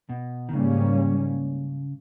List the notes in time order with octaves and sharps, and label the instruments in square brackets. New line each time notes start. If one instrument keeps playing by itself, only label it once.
[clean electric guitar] B2
D#3
[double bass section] G#2 G3 A#3 C#4 [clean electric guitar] C#3